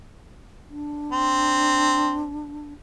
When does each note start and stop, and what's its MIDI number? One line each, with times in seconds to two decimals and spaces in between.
0.70 2.73 62
1.12 2.31 60